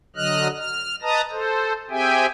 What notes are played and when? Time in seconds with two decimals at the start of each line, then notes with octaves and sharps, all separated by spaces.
0.16 D3 F#3 D#5 F6 F#6
0.57 F6
1.02 B4 D#5 A5 A#5 D#6
1.31 A4 C5
1.90 C4 G4 G#4 E5 G5 G#5